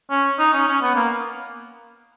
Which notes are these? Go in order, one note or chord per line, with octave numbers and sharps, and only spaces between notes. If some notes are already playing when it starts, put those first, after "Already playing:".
C#4
D#4
C#4
C#4
B3
A#3